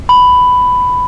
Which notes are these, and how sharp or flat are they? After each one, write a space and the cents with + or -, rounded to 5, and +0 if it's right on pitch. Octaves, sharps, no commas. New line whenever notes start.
B5 +10